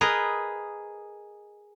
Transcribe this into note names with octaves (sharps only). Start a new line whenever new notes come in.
G#4 A#4 B4 D#5